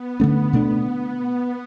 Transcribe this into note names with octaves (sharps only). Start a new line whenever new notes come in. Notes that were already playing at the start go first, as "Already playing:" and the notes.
Already playing: B3
D3 A3 C#4
B2 A3 D4